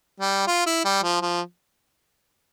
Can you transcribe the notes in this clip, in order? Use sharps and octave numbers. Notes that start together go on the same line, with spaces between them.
G3
F4
E4
G3
F3
F3